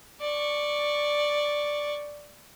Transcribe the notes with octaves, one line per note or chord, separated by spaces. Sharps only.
D5 C#6